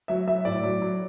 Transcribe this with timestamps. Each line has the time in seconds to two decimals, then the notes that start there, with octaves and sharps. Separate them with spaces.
0.08 F#3 E5
0.27 F#3 E5
0.45 A2 D5
0.63 F#3
0.82 F#3